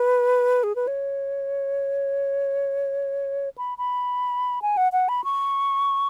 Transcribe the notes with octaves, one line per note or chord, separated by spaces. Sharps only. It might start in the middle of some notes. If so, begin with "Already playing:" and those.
Already playing: B4
G#4
B4
C#5
B5
B5
G#5
F#5
F#5
B5
C#6